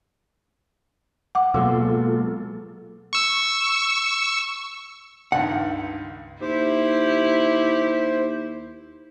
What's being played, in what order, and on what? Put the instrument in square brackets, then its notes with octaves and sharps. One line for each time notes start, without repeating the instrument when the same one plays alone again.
[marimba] F#5 D6
[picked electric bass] B2 F#3 G#3 [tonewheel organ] A#3 F4 A4
[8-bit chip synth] C#6 E6
[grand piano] C#2 G2 D#3 [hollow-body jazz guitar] F#5
[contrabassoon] D#2 [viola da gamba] E4 [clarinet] G4 [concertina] C5